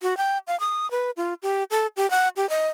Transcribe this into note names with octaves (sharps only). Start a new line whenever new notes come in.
F#4
G5
F5
D#6
B4
F4
G4
A4
G4
F#5
G4
D#5